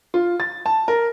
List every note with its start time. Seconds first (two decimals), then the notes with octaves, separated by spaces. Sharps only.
0.14 F4
0.40 A6
0.66 A5
0.88 A#4